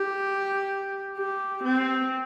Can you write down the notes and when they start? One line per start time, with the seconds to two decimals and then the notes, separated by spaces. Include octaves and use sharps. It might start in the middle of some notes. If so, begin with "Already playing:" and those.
Already playing: G4
1.17 G4
1.63 C4